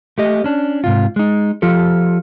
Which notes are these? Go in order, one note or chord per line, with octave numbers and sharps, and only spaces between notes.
A3 G4 D#5
C#4 D4
G#2 C3 F4
G#3 D#4
F3 F4 G4 A4